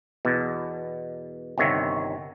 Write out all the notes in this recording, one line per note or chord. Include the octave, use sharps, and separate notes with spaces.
E2 B2
G1 C3 D#3 C#5 E5